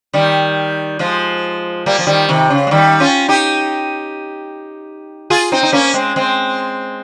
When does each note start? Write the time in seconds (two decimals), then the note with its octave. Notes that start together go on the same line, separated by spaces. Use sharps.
0.13 D#3 G3
0.99 F3 G#3
1.86 G3 A#3
1.99 F3
2.07 D#3 G3
2.29 C3 D#3
2.50 C#3
2.67 G#3
2.71 D#3 G3
3.00 C#4 F4
3.28 D#4 G4
5.30 F4 G#4
5.52 C4 D#4
5.63 D#4
5.72 A#3 C#4
5.94 G#3 C4
6.16 G#3 C4